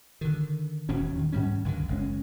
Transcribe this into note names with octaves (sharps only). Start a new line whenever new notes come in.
D3 D#3
D#1 E2 B2 C#4
D#3
G#2 G3 C#4
C#2 F#2 D3 D#3
F#1 G#3 C#4